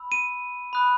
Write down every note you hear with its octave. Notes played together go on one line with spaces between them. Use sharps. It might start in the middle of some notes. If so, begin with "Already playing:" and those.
Already playing: B5 E6
D#7
B5 D#6 F#6